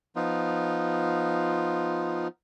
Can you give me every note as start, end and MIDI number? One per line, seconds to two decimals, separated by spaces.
0.16 2.28 53
0.16 2.28 59
0.16 2.28 63
0.16 2.28 65